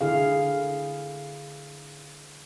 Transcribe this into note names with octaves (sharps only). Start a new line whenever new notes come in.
D3 E4 G#4 F5